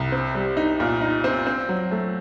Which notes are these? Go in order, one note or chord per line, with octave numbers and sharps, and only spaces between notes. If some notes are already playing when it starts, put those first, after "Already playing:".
Already playing: C2
C4
G3
D#4
A#2
D#4
C4
C4
F#3
A3